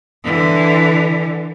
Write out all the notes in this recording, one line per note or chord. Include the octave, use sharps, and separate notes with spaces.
D3 E3